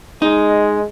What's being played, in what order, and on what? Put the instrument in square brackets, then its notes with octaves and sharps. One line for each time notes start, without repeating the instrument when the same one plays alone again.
[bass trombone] G#3 [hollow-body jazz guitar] D#4